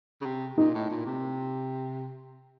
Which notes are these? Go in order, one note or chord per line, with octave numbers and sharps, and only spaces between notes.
C#3
C3
A#2 D#4
A2
A#2
C3